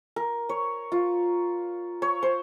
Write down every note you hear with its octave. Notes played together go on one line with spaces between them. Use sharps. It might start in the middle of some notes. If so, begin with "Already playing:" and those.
A#4
C#5
F4
C#5
C5